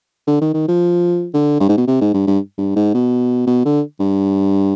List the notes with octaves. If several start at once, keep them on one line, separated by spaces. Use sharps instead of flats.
D3
D#3
D#3
F3
D3
G2
G#2
B2
C3
G#2
G2
G2
G2
G#2
B2
B2
D3
G2